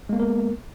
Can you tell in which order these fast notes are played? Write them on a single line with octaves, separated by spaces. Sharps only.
G#3 A#3 B3 A#4